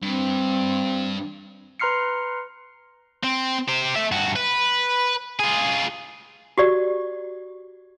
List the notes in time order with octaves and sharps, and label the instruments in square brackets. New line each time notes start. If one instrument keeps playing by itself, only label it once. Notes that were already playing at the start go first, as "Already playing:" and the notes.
[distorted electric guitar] G2 [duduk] C4
[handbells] B4 A#5 C6 F6 C7 C#7
[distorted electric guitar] C4
G4 C5
A3 E5
G2 F#4
B4
F4 G#4
[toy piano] F#4 G4 D5